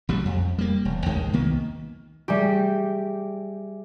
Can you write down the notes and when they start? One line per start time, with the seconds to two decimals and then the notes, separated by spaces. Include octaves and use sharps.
0.09 A1 F#3 G3
0.25 F2
0.58 G3 A#3
0.85 E1
1.06 A#1 D#2 D#3 G#3
1.33 C2 D#3 A#3 B3
2.28 G3 G4 G#4 E5 G#5